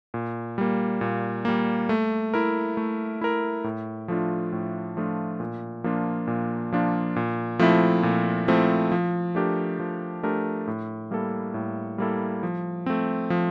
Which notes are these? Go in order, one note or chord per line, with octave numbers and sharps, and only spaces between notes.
A#2
G3 A#3
A#2
G3 A#3
A3
E4 A#4
A3
E4 A#4
A2
F3 A3 D4 F4
A2
F3 A3 D4 F4
A#2
F3 A#3 D4 F4
A#2
F3 A#3 D4 F4
A#2
F3 A3 C4 E4
A#2
F3 A3 C4 E4
F3
A3 D4 G4 A#4
F3
A3 D4 G4 A#4
A2
G3 A#3 E4 A4
A2
G3 A#3 E4 A4
F3
A3 C4
F3